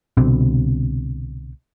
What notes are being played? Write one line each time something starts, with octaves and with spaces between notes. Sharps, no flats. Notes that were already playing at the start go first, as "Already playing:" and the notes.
C2 B2 D3 C4